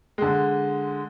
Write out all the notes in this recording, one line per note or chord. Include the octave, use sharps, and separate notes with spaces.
D3 G#3